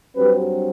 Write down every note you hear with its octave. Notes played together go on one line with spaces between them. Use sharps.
G2 F#3 C4 G4 B4